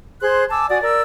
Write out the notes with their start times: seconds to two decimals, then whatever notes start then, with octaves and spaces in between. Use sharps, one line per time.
0.21 G#4 C5 C6 F#6
0.49 G#5 A5 D6 E6
0.68 F#4 D5 G#5 D#6
0.82 A#4 D5 E6